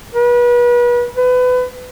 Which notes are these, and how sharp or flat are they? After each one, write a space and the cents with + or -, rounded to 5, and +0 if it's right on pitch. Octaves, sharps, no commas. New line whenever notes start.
B4 -35
B4 +25